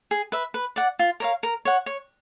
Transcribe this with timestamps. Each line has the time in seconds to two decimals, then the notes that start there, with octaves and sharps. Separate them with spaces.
0.11 G#4
0.32 B4 E5
0.54 B4
0.76 D5 F#5
0.99 F4
1.20 A#4 C#5 F5
1.43 A#4
1.65 C#5 F#5
1.86 C#5